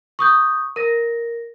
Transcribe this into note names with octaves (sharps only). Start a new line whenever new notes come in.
C#6 D#6 G6
A#4 A#6